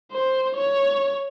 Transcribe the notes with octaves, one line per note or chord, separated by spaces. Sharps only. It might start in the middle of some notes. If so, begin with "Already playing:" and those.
C5
C#5